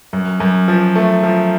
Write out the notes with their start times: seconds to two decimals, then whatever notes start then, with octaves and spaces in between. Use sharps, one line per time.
0.13 F#2
0.40 F#2
0.68 F3
0.96 A3
1.23 F3